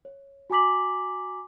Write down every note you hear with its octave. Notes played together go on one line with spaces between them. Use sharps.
C#5
F#4 G#5 A#5 D6 B6 F#7